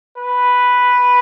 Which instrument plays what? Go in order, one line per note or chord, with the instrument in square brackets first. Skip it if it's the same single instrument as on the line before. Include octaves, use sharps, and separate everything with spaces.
[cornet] B4